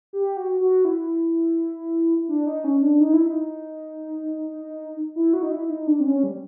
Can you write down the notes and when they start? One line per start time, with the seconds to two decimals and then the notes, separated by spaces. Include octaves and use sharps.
0.13 G4
0.37 F#4
0.61 F#4
0.85 E4
2.28 D4
2.46 D#4
2.64 C#4
2.82 D4
3.00 D#4
3.13 E4
3.27 D#4
5.16 E4
5.33 F#4
5.43 D#4
5.52 E4
5.70 D#4
5.87 D4
6.00 C4
6.06 C#4
6.24 G3